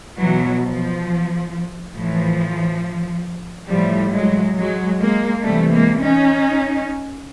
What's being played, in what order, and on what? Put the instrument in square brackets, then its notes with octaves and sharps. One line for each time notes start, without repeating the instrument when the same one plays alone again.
[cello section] B2 E3 F#3
F3
A2 E3 F3
A2 E3 F3 G3
F#3 G#3
F#3 G#3
G#3 A#3
C3 E3 G3 A3
G#3 A#3
C#4 D#4